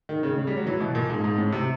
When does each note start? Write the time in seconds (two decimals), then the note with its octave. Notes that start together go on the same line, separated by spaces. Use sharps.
0.09 D#3
0.23 C#3
0.38 C#3
0.47 G3
0.57 F#3
0.67 E3
0.80 B2
0.95 A#2
1.10 G#2
1.24 G#2
1.38 A2
1.52 C3